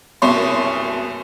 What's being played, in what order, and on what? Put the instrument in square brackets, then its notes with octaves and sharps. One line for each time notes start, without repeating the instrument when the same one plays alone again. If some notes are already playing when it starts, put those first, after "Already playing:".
[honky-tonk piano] F#1 C2 B2 C#5 C6